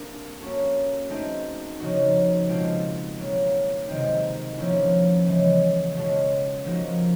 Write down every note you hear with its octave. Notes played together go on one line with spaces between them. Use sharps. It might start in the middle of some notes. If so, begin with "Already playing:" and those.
Already playing: A#3 C4 D4 G4 A#4
A#3 C#4 F#4 A4
A3 C4 D#4 G#4
C#3 F3 A#3 D#4 F#4
B2 G#3 C4 F4 A4
B2 F#3 A#3
C3 D#3 G#3 C4 D#4
F3 A#3 C#4 E4
C#3 E3 G#3
B2 G#3 C#4 F4 A4
F3 A#3 D#4 F#4 A#4